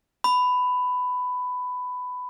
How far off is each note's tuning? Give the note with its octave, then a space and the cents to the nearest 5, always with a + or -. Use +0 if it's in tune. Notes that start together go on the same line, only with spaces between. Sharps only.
B5 +15